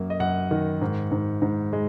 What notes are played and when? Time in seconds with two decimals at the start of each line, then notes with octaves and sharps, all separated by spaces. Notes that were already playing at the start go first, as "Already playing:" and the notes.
Already playing: F#2 A#3
0.10 D#5
0.20 F#2 F#5
0.51 D#3
0.81 G#2
1.12 G#2
1.42 G#2
1.73 G#3